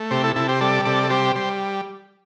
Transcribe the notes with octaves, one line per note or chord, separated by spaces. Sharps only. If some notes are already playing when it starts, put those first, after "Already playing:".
Already playing: A3
C3 G4 C5
E4 A4
C3 E4 A4
G4 C5
G3 A4 D5
C3 A4 D5
A4
G3 G4 C5
G3 C5